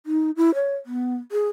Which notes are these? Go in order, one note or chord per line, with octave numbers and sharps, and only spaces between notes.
D#4
E4
C#5
B3
G#4